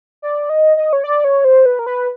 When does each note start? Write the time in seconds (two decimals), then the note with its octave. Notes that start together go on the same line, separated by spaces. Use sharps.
0.22 D5
0.50 D#5
0.77 D#5
0.93 C#5
1.04 D5
1.24 C#5
1.45 C5
1.66 B4
1.79 A#4
1.86 B4